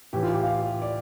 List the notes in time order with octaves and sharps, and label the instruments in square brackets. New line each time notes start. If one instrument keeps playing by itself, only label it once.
[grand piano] A2 E3 G4
F4
G4
F5
D5